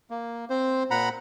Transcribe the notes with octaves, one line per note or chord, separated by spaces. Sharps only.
A#3
C4 C5
A#2 F#5 A#5 B5